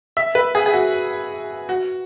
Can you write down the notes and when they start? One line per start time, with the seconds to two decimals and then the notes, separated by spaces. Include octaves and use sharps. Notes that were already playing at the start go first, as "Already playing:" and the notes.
0.17 E5
0.35 B4
0.55 G#4
0.66 G#4
0.73 F#4
1.69 F#4